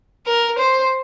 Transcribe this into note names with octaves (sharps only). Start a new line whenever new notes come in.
A#4
C5